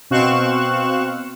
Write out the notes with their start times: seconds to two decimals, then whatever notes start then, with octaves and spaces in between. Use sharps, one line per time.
0.10 B2 C4 F5 C#6 F#6 E7